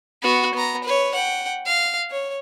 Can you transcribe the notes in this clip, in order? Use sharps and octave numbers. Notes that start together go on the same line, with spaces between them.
B3 F#4
B3 A#5
B4 C#5
F#5 G5
F5
C#5